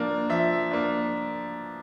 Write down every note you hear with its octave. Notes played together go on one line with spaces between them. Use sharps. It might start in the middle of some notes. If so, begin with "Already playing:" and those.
Already playing: F3 A#3 D4
F3 E5
A#3 D4